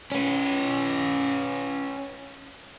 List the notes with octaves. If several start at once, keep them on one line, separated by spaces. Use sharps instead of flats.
C#4 B4